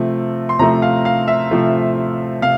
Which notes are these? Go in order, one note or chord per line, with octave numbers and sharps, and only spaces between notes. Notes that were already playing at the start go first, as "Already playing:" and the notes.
Already playing: C3 F3 A3
C6
C3 F3 A3 A#5
F5
F5
E5
C3 F3 A3
C3 F5